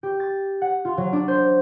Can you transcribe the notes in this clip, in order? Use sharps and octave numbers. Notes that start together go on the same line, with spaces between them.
G4
A6
F#5
F4
F#3
D4
C5